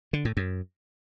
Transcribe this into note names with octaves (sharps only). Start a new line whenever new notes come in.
D3
A2
F#2